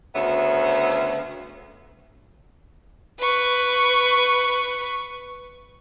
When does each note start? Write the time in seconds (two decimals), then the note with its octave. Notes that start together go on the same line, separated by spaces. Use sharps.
0.14 D2 C#3 B3 E5
3.20 B4 C#6